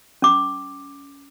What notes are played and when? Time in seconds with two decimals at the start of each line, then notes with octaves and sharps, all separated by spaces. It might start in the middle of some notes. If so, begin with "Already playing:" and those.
0.22 C#4 D6